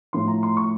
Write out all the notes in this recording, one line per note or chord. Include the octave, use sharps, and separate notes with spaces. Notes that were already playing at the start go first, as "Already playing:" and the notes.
A2 F3 C6
A#5
C6
C#6